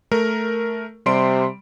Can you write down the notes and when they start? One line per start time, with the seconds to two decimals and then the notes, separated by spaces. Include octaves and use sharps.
0.11 A3 A#4
1.06 C3 G3 C6 D7